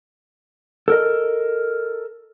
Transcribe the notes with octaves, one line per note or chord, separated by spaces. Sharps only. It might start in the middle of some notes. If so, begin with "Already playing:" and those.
A4 A#4 D#5